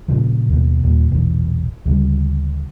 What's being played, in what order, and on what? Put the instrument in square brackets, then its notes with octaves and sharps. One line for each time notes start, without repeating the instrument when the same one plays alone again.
[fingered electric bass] A#2 C#3 F3
D#2 B2
D#2 A#2
A#1 E2 B2
D2 C#3 G3